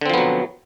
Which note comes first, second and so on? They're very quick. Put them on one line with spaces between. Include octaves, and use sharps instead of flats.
D3 C4 F3 B3 F#3